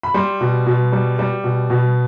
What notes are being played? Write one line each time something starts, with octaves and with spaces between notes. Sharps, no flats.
B5
G3 C6
B2
B2
G3
G3
B2
B2